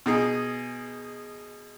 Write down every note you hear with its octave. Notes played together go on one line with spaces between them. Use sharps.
B2 D#4 G#4